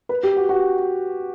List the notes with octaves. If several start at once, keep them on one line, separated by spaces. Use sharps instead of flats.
B4
G4
F#4
F#4